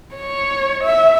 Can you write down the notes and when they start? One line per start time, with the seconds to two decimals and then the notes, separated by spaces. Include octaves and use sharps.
0.15 C#5
0.84 E5